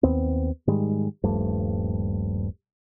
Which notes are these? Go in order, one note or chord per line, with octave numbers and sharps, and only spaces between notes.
D#2 B3 C4
G#2 D#3 G3 G#3
D#1 G2 F3 A3